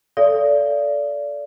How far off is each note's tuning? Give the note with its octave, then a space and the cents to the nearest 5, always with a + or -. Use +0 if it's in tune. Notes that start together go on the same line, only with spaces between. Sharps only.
A4 +0 D5 -25 F5 -35